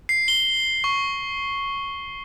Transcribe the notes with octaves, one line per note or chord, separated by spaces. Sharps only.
C7
G7
C#6